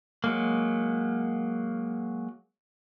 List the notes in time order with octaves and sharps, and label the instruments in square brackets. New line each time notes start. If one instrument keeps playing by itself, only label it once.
[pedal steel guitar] F#3 G#3 A#3